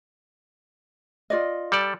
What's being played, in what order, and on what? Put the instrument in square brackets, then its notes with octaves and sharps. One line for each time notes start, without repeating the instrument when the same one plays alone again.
[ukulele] F4 D5 D#5
[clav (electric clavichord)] G3 A4 D5